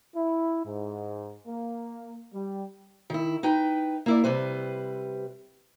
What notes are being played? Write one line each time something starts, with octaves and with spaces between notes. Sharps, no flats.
E4
G#2
A#3
G3
D#3 E4
D#4 B4 G5
A#3 E4 D5
C3 G3 B4 C5